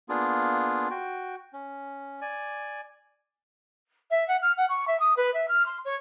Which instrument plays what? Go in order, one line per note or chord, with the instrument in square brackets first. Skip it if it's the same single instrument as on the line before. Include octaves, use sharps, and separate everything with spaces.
[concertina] A#3 B3 D4 F4 G#4
F#4 G5
C#4
D5 G#5
[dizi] E5
F#5
F6
F#5
C#6
E5
D#6
B4
E5
F6
C6
C#5